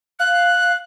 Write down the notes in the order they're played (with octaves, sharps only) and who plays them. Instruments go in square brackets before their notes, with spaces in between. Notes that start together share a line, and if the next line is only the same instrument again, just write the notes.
[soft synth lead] F5 [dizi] F#6